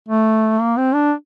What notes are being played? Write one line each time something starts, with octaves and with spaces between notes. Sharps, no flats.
A3
A#3
C4
D4